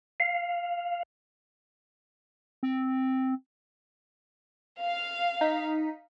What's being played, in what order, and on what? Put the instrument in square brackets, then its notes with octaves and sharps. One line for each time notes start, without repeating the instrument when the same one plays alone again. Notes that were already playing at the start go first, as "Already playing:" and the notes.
[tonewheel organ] F5
[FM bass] C4
[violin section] F5
[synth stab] D#4 B6